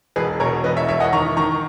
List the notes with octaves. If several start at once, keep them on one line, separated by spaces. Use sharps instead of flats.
E1 G#4 B4
B2 A#4 C#5
E1 B4 D#5
C#5 E5
E1 C#5 E5
D#5 F#5
D#3 A#5 C#6
D#3 A#5 C#6